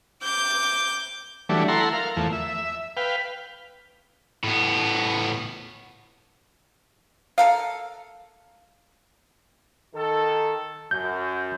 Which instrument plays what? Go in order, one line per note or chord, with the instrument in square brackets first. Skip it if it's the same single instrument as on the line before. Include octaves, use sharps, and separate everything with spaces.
[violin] D6 G6
[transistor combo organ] E3 F#3 G3 A3 D4
E4 A4 F#5 A#5 C6
A#4 F5
E2 F3 A3
E5
B4 F5 G5
[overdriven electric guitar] A2 B3
[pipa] A4 A#4 F5
[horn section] D#3 A4
[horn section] F#2 [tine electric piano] G6